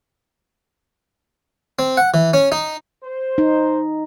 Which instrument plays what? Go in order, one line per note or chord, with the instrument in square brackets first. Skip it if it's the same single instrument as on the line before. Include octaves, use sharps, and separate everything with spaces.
[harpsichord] C4
F#5
E3
C#4
D#4
[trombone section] C5
[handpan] D#4